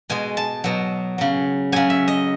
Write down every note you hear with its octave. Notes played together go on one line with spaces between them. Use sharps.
B2 G#3 G#5
A5
B2 F#3
C#3 F#3
C#3 F#3 G#5
E5
D#5